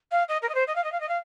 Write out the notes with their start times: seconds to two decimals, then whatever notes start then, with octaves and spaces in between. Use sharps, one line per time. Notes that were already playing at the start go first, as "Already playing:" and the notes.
0.12 F5
0.29 D#5
0.42 A#4
0.49 D#5
0.55 C5
0.67 D#5
0.76 F5
0.84 D#5
0.92 F5
1.00 D#5
1.09 F5